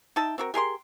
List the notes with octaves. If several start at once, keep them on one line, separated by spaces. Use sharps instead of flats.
D#4 E5 G5 A5
C4 F#4 A#4
G4 G#4 A#4 C6